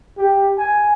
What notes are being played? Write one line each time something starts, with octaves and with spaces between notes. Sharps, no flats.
G4
G#5